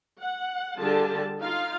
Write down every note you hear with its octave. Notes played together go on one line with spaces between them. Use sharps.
F#5
D3 G3 F4 G4 G#4 A5
D#4 F4 F5